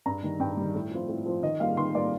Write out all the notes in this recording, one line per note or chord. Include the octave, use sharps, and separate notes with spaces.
G2 A#5
D#3 G3
G2 G5
G3
D#3
A2
F3 C4 F4
A2
F3 C4 F4
D#3 D#5
G3 A#3 F4 F5
D#3 C6
G3 A#3 F4 D5